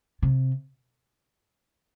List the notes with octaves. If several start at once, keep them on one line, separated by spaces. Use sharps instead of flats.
C3